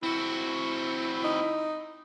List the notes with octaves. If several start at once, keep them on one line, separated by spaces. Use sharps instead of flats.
C4 E4 F#4
D#4